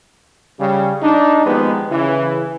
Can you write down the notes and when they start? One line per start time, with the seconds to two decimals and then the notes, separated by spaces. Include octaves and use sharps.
0.59 C#3 G3
1.02 D4 D#4
1.45 D#2 F3 G#3 B3 G4 B4
1.89 C#3 E3